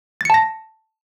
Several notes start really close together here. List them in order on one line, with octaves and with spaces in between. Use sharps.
A6 C#7 A5 A#6